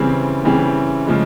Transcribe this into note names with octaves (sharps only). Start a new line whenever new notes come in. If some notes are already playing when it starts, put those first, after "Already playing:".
Already playing: C#3 E3 G3 C4
C#3 E3 G3 C4
C#3 F3 G#3